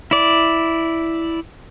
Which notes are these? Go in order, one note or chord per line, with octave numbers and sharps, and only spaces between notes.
E4 D5